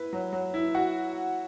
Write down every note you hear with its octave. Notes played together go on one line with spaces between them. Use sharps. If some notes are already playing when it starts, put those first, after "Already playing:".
Already playing: E4 B4
F#3
F#3
E4
F#4